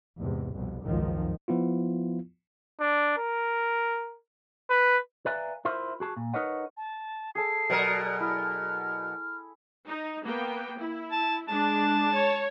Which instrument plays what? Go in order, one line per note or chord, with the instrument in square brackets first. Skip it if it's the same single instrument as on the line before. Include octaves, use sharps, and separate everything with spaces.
[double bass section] E2 G#2 C3
C2 F2 B2
G#1 C#2 F#2 D#3 F3
[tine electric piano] F3 B3 E4 F4
[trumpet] D4
A#4
B4
[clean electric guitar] B4 D5 E5 F5 G#5 A#5
E4 F4 A#4 C5 E5
F#4 G#4 A5
A#2
D#4 A#4 B4 C#5 D#5 F#5
[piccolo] A5
[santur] G#4 A4 A5 [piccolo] C7
[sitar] B2 F#3 A#4
[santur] E4 [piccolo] F6
[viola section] D#4
A#3 B3 G5
E4
[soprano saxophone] A5
[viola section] G#3 D4 [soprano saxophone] A5
[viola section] C#5